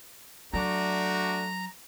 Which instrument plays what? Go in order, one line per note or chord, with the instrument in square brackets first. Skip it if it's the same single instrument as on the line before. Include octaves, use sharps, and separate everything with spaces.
[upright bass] F#3 [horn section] A3 D4 F#4 [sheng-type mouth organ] A#5